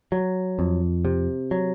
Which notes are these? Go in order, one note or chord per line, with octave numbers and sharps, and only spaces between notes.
F#3
F2
C3
F#3